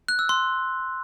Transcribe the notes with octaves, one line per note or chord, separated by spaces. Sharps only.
F#6
E6
C6